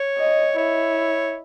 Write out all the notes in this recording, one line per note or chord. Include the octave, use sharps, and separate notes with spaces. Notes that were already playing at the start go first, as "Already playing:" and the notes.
Already playing: C#5
D#5
E4 C#5